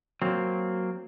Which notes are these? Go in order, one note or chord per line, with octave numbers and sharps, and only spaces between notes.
F#3 A#3 C4